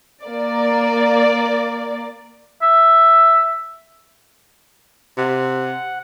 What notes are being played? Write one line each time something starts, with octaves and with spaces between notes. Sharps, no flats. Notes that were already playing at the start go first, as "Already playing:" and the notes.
A#3 D5
E5
C3 F#5